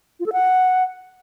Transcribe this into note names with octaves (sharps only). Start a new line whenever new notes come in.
F4
A4
F#5